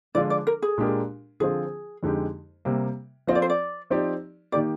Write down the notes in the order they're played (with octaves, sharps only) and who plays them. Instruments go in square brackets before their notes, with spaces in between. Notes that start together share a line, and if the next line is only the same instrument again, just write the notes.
[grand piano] D3 F3 G#3 D4 F4 [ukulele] D5
[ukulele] D5
A#4
G#4
[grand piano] A#2 G#3 D4 G4 A#4
[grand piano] D3 F3 C4 F4 [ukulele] G#4
[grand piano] F2 D3 G#3 D#4 G4
C3 G3 A#3
[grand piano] F3 C4 F4 [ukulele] D#5
[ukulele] D5
C5
D5
[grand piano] F3 C4 D#4 G4 D5
[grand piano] D#3 A#3 D#4 G4 [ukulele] D5